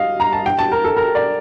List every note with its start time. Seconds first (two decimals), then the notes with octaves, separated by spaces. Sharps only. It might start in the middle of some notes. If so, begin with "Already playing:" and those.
Already playing: D#5 F5
0.20 A#5
0.33 A5
0.46 G5
0.59 A5
0.72 A#4
0.84 A4
0.97 A#4
1.15 D5